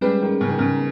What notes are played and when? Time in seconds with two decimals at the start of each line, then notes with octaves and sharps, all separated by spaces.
0.01 G3 G#3 C#4 G#4 B4
0.21 D#3
0.41 C#3
0.49 D#3
0.59 C#3